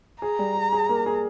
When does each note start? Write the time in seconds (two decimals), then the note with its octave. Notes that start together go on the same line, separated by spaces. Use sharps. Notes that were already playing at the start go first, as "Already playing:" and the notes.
0.22 G#4 A#5
0.39 G3
0.55 G#4
0.72 G#4
0.89 A#3
1.06 G#4